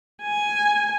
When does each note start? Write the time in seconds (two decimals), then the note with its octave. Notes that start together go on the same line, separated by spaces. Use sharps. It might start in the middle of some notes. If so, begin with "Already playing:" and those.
0.22 G#5